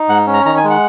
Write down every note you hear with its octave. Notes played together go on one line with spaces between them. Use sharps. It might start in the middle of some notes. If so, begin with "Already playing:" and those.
Already playing: D#4
G#2 F#5
C#4
A#5
D#3 A#5
G#5
G#3
F#5